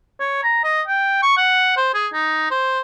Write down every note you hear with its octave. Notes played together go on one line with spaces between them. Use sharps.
C#5
A#5
D#5
G5
C#6
F#5
C5
G#4
D#4
C5